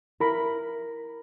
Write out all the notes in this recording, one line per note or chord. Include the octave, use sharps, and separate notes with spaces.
E4 A#4 B5